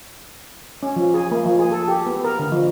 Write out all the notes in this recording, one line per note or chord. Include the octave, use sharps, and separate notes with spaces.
C#4
F3
G#4
A#3
F3
G#4
A4
G4
B3
A#4
D3
F3